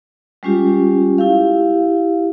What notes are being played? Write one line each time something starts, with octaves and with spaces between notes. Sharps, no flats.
G3 G#3 C#4 F4 G4
E4 G4 F5